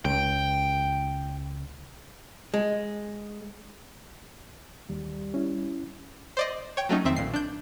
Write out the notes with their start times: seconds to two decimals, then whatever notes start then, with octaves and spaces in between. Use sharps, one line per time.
0.05 C#2 G5
2.54 G#3
4.90 D#2 G3
5.34 C#4 E4
6.37 C5 D5 D#5
6.77 C#5 G5
6.89 F#3 A3 C#4 D#4
7.04 F2 D#3 C4 E5
7.16 B1 A#2 C7
7.34 D4 G6